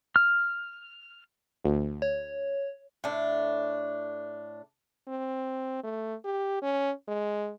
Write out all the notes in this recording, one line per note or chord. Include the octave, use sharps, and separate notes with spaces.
F6
D2
C#5
A2 D4
C4
A3
G4
C#4
G#3